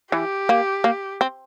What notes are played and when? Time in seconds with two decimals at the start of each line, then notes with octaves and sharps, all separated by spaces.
0.12 E3 G4
0.49 A#3
0.84 A#3
1.21 C4